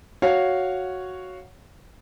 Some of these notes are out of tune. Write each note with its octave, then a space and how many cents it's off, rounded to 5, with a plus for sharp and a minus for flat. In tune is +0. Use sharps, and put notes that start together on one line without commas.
F#4 +0 C#5 +0 F5 +0